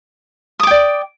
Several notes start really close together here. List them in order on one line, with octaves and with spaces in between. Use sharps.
D#6 D6 G5 D5